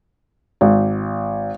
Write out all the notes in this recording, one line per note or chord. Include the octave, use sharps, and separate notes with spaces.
G#1